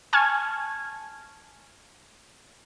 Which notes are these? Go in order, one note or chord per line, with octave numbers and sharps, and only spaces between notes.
G#5 A5 C#6 F6 G#6